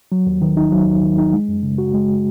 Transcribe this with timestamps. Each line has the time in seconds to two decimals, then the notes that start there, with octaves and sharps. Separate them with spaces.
0.12 F#3
0.27 D#2
0.42 D#3
0.57 D#4
0.72 F#3
0.87 D#2
1.03 D#3
1.18 D#4
1.33 G#3
1.49 F#2
1.63 C#3
1.78 F#4
1.94 G#3